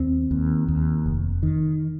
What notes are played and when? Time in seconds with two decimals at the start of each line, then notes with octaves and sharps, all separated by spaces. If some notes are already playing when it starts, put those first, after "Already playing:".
Already playing: D#2 C4
0.31 D#2
0.68 D#2
1.06 F1
1.43 D#3